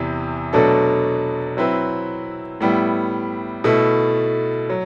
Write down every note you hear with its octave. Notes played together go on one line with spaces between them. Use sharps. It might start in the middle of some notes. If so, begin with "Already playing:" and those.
Already playing: E2 C3 E3
B2 F#3 A3 D4 A4
F#3 C4 E4 B4
A2 G3 B3 E4
B2 A3 E4
F#3